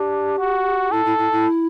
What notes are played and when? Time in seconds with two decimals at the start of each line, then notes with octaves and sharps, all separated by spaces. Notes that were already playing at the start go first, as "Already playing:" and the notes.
Already playing: D4 G4
0.39 F#4
0.92 E4 A4
1.05 E4
1.18 E4
1.32 E4